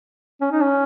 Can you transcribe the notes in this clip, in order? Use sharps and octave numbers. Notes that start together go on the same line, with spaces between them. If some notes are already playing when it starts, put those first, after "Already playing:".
C#4
D#4
C#4